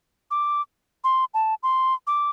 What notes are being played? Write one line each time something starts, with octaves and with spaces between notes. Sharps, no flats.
D6
C6
A5
C6
D6